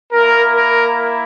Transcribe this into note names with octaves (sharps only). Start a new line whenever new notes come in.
A#3 E4 A#4
A#4